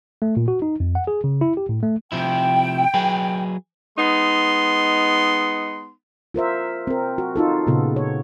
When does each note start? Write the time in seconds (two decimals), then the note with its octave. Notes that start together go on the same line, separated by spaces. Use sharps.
0.22 A3
0.37 A#2
0.48 F#4
0.62 D#4
0.80 F2
0.95 F#5
1.07 G#4
1.24 C#3
1.41 E4
1.57 G4
1.69 A2
1.83 A3
2.12 C3 F3 E4 G5
2.94 F#3 G#4 B4
3.97 G#3 B3 D#4 C6
6.34 F4 A#4 C5 E5
6.87 C4 A#4
7.18 F#4
7.36 D#4 F4 A4
7.67 A#2 C#3 B3 A4
7.96 C#5